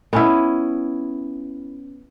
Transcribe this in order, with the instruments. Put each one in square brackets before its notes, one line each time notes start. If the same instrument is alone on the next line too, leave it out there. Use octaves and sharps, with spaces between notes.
[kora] B3 C#4 E4